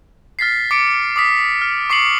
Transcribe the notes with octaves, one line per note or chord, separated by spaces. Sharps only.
F6 A6 B6 C7
D6 C#7 D7
D6 D#6 B6
F6
C#6 D6 C7 C#7 F#7